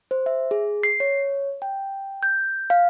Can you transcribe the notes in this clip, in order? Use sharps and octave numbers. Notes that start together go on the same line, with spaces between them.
C5
E5
G#4
C7
C#5
G5
G6
F5